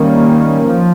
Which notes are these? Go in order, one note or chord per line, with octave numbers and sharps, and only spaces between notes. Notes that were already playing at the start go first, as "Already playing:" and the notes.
Already playing: D#3 G3 A#3 C#4
F3